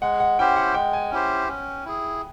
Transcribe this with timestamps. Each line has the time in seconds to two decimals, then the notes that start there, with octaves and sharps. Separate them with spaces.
0.01 G#3 F#5
0.20 F#5
0.39 C#4 E4 G4 C5 G5
0.56 F#5
0.74 G#3 G5
0.93 G#5
1.11 C#4 E4 G4 C5
1.48 C#4
1.85 E4 G#4